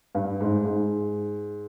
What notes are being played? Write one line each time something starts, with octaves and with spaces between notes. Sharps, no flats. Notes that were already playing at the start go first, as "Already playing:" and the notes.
G2
G#2
G#2